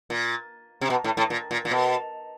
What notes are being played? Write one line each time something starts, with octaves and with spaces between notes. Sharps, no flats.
A#2
C3
B2
A2
A2
A#2
A#2
A#2
B2